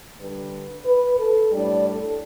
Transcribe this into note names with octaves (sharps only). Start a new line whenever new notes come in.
D3 G3 D4 B4
B4
A4
A2 G3 D4 D5
A4